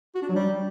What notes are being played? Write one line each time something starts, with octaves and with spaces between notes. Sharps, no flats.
F#4
D4
F#3
G3